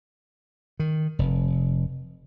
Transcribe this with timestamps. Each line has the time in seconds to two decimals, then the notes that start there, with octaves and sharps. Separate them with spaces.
0.80 D#3
1.19 F1